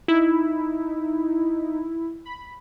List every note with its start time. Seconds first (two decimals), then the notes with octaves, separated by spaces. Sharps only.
0.08 D#4 E4
2.25 B5